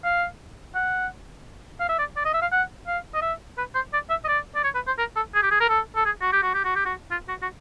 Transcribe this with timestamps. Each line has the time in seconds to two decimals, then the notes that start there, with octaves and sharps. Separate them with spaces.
0.04 F5
0.75 F#5
1.80 F5
1.89 E5
1.99 D5
2.16 D5
2.25 D#5
2.34 E5
2.42 F5
2.52 F#5
2.87 F5
3.14 D#5
3.22 E5
3.58 B4
3.75 C5
3.93 D5
4.10 E5
4.24 D#5
4.28 D5
4.55 D5
4.64 C#5
4.75 B4
4.87 C5
4.99 A#4
5.16 A4
5.34 G#4
5.43 G4
5.51 G#4
5.60 A#4
5.69 A4
5.96 A4
6.05 G#4
6.22 F#4
6.33 G4
6.43 F#4
6.54 G4
6.64 F#4
6.75 G4
6.85 F#4
7.11 F4
7.29 F#4
7.42 F#4